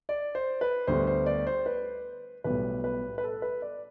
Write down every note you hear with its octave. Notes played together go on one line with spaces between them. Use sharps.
D5
C5
B4
D2 D3 G3 B3 C5
C5
D5
C5
B4
B1 A2 G3 B3 B4
B4
B4
A4
B4
D5